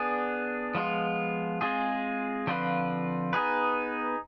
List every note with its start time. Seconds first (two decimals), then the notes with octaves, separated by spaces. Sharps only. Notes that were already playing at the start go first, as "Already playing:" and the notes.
Already playing: B3 D4 G#4
0.75 F3 G#3 B3 F4
1.61 G#3 C4 F4 G#4
2.47 D3 F3 C4 F4 B4
3.33 B3 D#4 G#4 B4